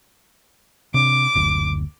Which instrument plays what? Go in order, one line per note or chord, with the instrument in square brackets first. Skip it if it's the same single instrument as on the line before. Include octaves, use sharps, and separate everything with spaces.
[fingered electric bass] C3 D4 [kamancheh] D6
[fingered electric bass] F#1 D2